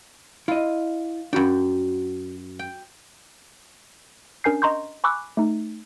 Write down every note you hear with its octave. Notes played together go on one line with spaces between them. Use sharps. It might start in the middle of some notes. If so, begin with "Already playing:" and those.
E4 F4 D#5
F#2 D4 F#4 G5 B5
G5
C#4 D4 A#4 G#5 G6 C7
D#5 A#5 C6 C#6 G6
G#5 B5 C#6 D6 E6 F#6
A3 D#4